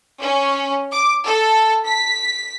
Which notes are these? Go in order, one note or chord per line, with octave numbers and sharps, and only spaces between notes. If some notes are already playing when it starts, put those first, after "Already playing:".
C#4
D6
A4
B6